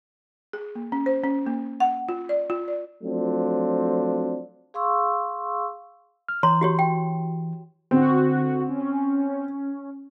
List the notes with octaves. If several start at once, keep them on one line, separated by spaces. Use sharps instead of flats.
G#4
A#3
C#4
C5
C#4
A#3
F#5
F4
D5
F4
D5
F3 F#3 A3 C4 D4 F4
G#4 F5 C6 C#6 E6
F6
E3 C#5 A#5 C6
F#4 G4 C#5
G5
D3 C4 F#4
C#4